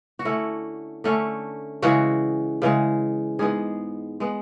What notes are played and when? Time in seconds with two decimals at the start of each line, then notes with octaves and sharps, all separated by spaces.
0.19 F#4
0.25 D3 A3 C#4 E4
1.04 D3 A3 C#4
1.82 C#3 E3 G#3 F#4
2.62 C#3 E3 G#3
3.39 G#2 G#3 B3 G#4
4.20 G#3 B3